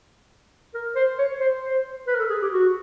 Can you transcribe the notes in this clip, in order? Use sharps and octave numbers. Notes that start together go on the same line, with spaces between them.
A#4
C5
C#5
C5
C5
B4
A#4
A4
G#4
G4
F#4